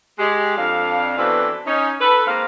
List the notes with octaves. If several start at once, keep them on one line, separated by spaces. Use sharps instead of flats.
G#3 G4
F2 D4 F5
B2 E3 C4 D4 A4 B4
C#4 D#4
A4 B4
G#2 A#3 C4 F5